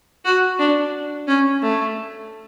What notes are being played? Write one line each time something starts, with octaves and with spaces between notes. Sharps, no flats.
F#4
D4
C#4
A3